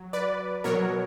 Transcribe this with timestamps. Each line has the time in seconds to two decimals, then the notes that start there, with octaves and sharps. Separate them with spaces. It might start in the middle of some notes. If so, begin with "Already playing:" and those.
Already playing: F#3
0.13 B4 D5
0.64 B2 F#3 A#4 C#5